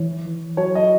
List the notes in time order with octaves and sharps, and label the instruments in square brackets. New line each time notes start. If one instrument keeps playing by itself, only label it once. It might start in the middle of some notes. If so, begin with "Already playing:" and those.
Already playing: [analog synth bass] E3 [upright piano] C#5
[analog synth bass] F#3 [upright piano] C#5
[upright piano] D#5